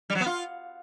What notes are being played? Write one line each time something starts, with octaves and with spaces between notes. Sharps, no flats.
G3
F#3
B3
F4